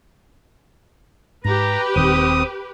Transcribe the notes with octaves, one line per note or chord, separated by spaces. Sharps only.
G#2 G4 B4 A#5
D#1 D#3 C4 D#6